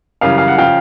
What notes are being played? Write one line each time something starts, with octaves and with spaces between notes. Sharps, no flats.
F#2 C#3 E3 G3 F5
F5
F#5
C#3 F3 F5 G5